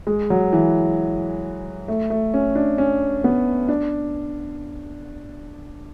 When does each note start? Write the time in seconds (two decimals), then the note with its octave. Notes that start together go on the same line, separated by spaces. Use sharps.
0.07 G#3
0.30 F#3
0.53 E3
1.88 A3
2.10 A3
2.34 C#4
2.55 D4
2.78 C#4
3.24 B3
3.68 D4